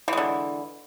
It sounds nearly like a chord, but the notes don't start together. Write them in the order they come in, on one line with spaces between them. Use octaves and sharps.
E3 G#3 D3